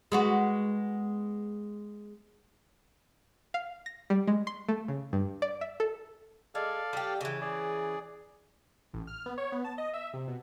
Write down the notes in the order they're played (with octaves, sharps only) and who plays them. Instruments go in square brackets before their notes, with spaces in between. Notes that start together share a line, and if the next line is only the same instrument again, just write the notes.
[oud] G#3 B3 F#4
[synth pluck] F5
A#6
G3
G#3
C6
A3
C#3
G2
D5
E5
A4
[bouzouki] G#3 [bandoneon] A4 D5 F5
[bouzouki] G3 G4
C#3 E3
[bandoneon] G#4 D5
[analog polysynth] A1
F6
B3
C#5
B3
A5
D#5
E5
C3
B2